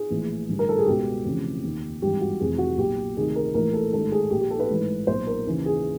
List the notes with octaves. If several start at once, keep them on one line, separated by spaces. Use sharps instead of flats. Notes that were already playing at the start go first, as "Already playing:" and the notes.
Already playing: G#4
A#1 A2 E3
A1 G2 D3
A#4
A4
G#4
C#2 B2 G4
F1 F2 C#3 E3
D#2 D#3
G#1 G2 E3 G4
F#4
F1 F2 C3 E3 G#4
F#4
B1 A#2 G4
D2 C3 D#3 G#4
A#4
A#1 A2 E3 A#4
A4
A1 G#2 D#3 A4
G#4
A#1 A#2 G4
G4
A4
B4
A1 G#2 E3
B1 A#2 C5
A#4
D#2 C#3 E3
G#4